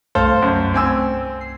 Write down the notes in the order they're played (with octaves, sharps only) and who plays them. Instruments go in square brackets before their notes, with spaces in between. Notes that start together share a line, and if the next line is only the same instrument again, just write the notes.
[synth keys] C2 G2 A3 [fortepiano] A4 C5 F5
[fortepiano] F#2
C4 G#5 E6
[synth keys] C7